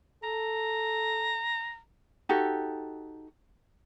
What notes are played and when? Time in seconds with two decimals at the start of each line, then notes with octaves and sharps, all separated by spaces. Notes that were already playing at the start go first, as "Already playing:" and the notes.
0.23 A4 A#5
2.29 D#4 F#4 G4 A4